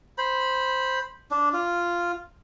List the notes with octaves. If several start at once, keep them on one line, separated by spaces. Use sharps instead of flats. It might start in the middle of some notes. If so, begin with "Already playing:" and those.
C5 B5
D4
F4